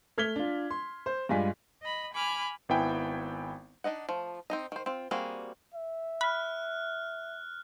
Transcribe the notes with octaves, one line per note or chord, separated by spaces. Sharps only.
A3 F6 G#6 B6 G7
D4 F4
C6
C5
G2 G3 G#3 F4 G#5 B6
D#5 B5
G#5 B5 D6 F6
G#1 B3 E4 G5 G#5
D4 D#4 D#5 F#5
F3 A3
C4 D#4 D#5
D#3 C5
C4 F4
G3 A#3 C4 F#4 G#4
E5
B5 F6 F#6